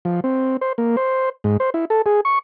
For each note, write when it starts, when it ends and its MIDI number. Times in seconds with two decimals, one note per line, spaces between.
0.05 0.20 53
0.24 0.57 60
0.61 0.73 72
0.78 0.96 58
0.97 1.29 72
1.44 1.57 44
1.60 1.70 72
1.74 1.85 64
1.90 2.02 69
2.06 2.21 68
2.25 2.39 85